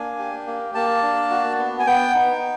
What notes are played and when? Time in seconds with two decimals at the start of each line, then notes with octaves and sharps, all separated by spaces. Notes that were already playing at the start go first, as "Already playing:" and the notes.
Already playing: A#3 D4 G#5
0.19 G4
0.47 A#3
0.75 A#3 A5
1.02 D4
1.31 F#4
1.59 B3
1.79 G#5
1.86 B3 G5
2.15 D#4